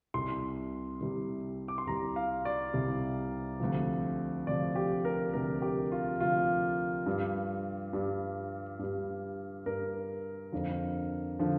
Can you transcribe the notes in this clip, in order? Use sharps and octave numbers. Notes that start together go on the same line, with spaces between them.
C2 C3 G3 C6
C2 C3 G3
D6
C6
C2 C3 G3 A#5
F5
D5
C2 C3 G3
D2 C3 F3
D2 C3 F3 D5
G4
A#4
D2 C3 F3 A#4
G4
F4
D2 C3 F3 F4
G2 G3
G2 G3
G2 G3
G2 G3 A#4
F2 D3 F3
D3 F3